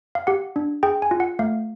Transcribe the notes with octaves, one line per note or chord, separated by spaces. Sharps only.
F5
G4 F#5
D4
G#4 G5
G#5
F4
F#5
A3 F5